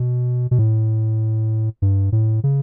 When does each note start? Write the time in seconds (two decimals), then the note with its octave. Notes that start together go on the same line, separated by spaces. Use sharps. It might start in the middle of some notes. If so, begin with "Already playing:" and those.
Already playing: B2
0.51 B2
0.59 A2
1.82 G2
2.12 A2
2.44 C#3